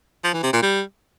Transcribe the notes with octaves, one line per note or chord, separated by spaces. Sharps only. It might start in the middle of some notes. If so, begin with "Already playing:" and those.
F3
E3
C3
A#2
G3